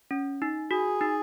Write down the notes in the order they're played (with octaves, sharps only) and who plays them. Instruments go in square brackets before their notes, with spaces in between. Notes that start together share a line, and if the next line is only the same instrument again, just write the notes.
[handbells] C#4
D#4
[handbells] F#4 [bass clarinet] G#4
[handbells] D#4